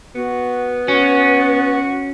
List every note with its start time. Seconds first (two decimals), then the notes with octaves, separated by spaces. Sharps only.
0.15 B3 F#4
0.88 C#4 F#4